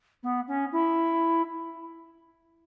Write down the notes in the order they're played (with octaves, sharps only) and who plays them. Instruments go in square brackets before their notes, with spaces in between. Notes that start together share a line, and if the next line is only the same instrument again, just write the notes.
[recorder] B3
C#4
E4